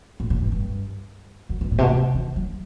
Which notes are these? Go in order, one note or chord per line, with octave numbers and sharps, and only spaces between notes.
A2
A2
G2
G2
F#2
G2
A2
C3
B2
C3
D#3
F#3